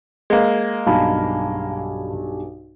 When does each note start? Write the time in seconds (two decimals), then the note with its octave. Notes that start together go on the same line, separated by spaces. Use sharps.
0.30 G#3 A#3
0.87 B1 G2 F5 G#5 A5 B5